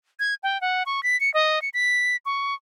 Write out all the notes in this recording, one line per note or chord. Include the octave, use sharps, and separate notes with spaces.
G#6
G5
F#5
C#6
B6
C#7
D#5
C#7
B6
C#6